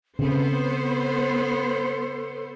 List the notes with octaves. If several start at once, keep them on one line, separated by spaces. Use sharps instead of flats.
C#3 B3 C4 A4 C5